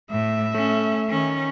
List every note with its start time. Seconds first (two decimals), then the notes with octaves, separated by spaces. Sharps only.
0.11 A2 E5
0.54 A3 C#4
1.09 D#3 C#4